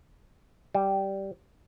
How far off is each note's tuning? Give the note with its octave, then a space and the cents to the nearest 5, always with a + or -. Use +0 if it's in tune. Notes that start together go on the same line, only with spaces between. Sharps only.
G3 -10